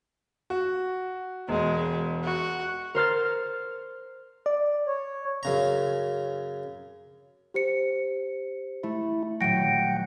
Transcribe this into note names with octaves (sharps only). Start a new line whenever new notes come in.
F#4
E1 G#3
F#4
A#4 C5 F6 A6
D5
C#5
F#2 C#3 A#5
G4 C5 C#7
A3 E4
D#1 F#3 F#5 G5 A#6 D7